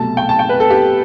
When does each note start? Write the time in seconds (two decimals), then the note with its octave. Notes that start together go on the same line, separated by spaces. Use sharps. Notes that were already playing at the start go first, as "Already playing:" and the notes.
Already playing: C2 B2 F#3 A3 A5
0.17 G5
0.29 A5
0.39 G5
0.49 B4
0.60 A4
0.70 G4